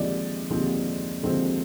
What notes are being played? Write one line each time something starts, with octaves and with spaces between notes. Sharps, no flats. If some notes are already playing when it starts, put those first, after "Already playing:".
Already playing: D#2 D3 F3 G#3 C4 D5 D#5
D#2 D3 F3 G#3 C4
D#2 D3 F3 G#3 C4